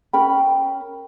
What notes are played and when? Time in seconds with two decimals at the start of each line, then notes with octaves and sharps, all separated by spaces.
0.13 C#4 A#4 G5 B5